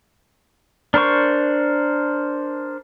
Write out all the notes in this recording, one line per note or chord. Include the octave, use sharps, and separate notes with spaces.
D4 A#4 C5 C#6